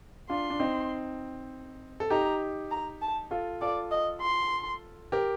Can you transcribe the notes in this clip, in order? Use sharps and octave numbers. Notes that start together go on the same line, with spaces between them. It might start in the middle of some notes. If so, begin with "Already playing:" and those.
D4 F4 C6
D4
C4 D#4
A4
D#4 G4 A#5
A#5
A5
F4 A4
F4 A4 D5
D#5
C6
G4 A#4